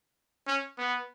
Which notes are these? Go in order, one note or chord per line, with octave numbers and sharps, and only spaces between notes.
C#4
B3